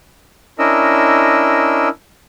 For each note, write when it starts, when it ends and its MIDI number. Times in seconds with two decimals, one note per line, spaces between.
0.59 1.89 61
0.59 1.89 62
0.59 1.89 64
0.59 1.89 70
0.59 1.89 75
0.59 1.89 88